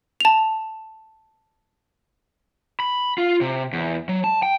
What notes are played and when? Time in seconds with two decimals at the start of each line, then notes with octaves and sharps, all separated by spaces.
0.20 A5 F7
2.80 B5
3.18 F4
3.41 C3
3.73 E2
4.09 F#3
4.24 A5
4.43 G5